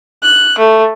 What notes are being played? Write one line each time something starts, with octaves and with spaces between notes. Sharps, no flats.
F#6
A3